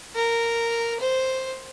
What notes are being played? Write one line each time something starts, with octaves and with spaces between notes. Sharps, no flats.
A#4
C5